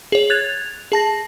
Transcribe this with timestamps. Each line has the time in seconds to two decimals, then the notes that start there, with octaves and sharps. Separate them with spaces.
0.12 G#4 C#5
0.30 F#6 G#6 A6 F7
0.92 G#4 A5 A#6